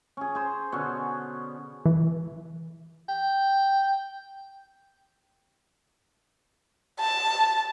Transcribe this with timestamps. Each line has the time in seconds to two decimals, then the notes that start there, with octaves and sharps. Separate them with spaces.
0.17 C#4 G#4
0.35 G#4 C5
0.72 B2 D3 C#4
1.86 E3
3.09 G5
7.00 A5